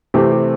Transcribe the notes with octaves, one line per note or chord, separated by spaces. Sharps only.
C3 E3 A3 C4 G4
G4